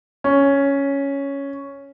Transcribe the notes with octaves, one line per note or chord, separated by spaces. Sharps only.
C#4